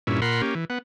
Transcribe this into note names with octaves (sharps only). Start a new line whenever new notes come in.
G2 A#2 C#4 E4
A#2 A#4 F#5 B5 C6
A#3 C#4 G4
E3
B3 F#5